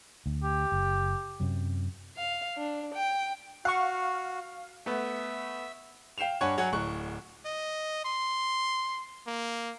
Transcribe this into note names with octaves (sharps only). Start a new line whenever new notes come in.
D2
G4
F#1
F#2 C3 F#3
F5
D4
G5
F#4 F5 F#5 C#6
A3 B3 E5
F5 G5 C7 E7 F7
G2 C#5 F#5 G#5 C#6 G#6
F#3 C#5 F#5 G#5 G#6
D1 C#6 F#6
D#5
C6
A#3